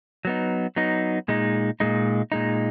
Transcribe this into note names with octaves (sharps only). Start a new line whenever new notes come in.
F#3 B3 D#4
F#3 B3 D#4
A#2 G#3 D#4
A#2 G#3 D#4
A#2 G#3 D#4